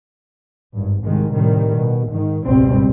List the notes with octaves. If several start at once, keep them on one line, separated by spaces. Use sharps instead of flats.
G#1 G2
C2 G#2 D#3 G#3
A2 C3 D#3 G3
B2
G#2 D#3
G#1 C#2 G2 B2 G3 C4